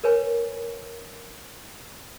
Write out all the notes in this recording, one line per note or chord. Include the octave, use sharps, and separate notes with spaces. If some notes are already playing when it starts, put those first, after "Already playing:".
A#4 B4 C#5 G#5